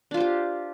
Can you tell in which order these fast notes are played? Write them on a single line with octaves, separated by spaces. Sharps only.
D4 F4 C5 G4